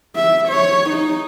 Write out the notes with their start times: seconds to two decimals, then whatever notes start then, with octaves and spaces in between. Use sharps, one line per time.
0.16 E5
0.49 C#5
0.90 D#4